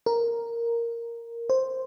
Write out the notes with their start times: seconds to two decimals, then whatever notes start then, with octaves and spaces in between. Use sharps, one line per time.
0.06 A#4
1.50 C5